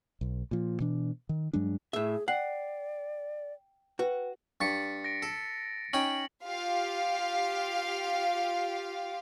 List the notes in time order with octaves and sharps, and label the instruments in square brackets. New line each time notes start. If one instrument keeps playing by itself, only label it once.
[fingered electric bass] B1
A#2 F3
B2 E3 D4
D#3
G2 F#3 G#3 D4
[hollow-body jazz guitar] A2 E5 [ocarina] G#4
[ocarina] D5 [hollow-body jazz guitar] F#5 [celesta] G5 C7
[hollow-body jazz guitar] F#4 [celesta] B4 G5
[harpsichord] G2 C#6 [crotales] A6 B6 C#7
[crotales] A#6 D7
[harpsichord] A4
[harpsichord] C#4 D#4 G5 [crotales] F#7
[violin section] F4 G4 F5